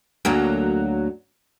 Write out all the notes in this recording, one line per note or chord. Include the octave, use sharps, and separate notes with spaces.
D2 F#3 A#3